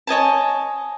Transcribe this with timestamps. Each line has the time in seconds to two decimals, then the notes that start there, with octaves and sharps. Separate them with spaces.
0.07 C#5 D#5 G#5 A5